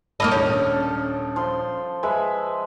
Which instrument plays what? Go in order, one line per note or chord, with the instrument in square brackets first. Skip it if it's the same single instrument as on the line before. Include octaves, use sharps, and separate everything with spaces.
[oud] A#3 D#4 D#5 [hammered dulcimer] A4 [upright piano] B5 D#6 F6
[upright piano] D#1 D4 G6 [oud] C#4
[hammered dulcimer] F3 C5 C6
[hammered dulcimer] G#3 [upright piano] B4 E5